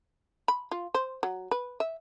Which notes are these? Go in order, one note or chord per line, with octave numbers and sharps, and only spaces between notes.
B5
F4
C5
F#3
B4
E5